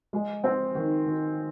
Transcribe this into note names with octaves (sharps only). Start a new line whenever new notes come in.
G#3
C4
D#3
D#3